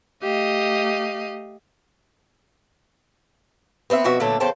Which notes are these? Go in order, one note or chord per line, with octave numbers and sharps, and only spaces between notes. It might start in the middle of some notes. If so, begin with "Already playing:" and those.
A3 G4 D#5 F5
B3 C4 C#5 E5
F2 B2 F#4 E5
A#2 D3 F#3 A3 A4
E2 C#3 A4 C5 G5 A5